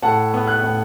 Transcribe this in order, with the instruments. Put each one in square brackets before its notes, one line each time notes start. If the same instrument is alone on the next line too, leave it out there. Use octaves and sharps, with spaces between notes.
[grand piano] A2 F#5 A5
B3
F#6
A2